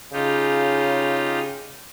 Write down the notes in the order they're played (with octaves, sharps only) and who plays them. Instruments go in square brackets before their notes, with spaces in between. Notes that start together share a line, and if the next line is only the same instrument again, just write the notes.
[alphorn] C#3 [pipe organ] D#4 F4 G4